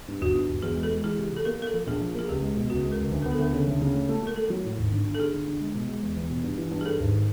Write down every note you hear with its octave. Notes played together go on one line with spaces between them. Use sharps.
G2
G1 F#4
G2
G1
E2 G#4
G#3
A4
G#3
E3 G#4
C3
C3
A4
A#3 A#4
A#3 A#4
A4
F3
A#1 G#4
F3
A#3 G#4
C#2 G4
G#3
B2
C#2 F#4
G#3
A#4
C#2
D2
B3 A#4
A4
D2 A#4
C#3 A4
D2
C#3
A3
A3
A3 A#4
A3 A4
F#3
A2
G#1
D3
D3
A4
D3 G#4
D3
D3
G#3
B2
G#3
E2
E2
B2
G2
E3
G2
G#4
G2 A4
G#1